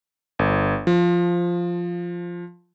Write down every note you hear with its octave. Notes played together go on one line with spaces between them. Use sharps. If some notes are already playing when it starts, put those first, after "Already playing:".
G1
F3